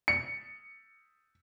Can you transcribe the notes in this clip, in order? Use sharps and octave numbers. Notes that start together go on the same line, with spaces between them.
C#7